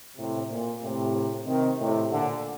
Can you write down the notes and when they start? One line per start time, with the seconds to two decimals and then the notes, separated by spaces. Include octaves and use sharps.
0.18 A2 C3
0.49 A#2
0.82 A2 C3
1.46 C3 D#3
1.79 A2 C3
2.10 A#2 D3